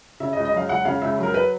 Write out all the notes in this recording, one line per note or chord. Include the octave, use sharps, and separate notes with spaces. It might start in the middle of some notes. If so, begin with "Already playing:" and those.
C#3 E5
D#5
C#2
D#5
F#3 F5
C#2 F#5
C#3 F5
C#2 E5
F#3
A#4
B4